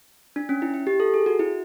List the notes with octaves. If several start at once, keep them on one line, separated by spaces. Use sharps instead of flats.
D4
C#4
E4
E4
G4
A4
G#4
F#4
E4